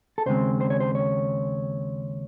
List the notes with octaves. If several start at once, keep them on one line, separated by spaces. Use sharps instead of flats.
A4
D#2 C#3 G#3 C4 C5
C5
C#5
C5
C#5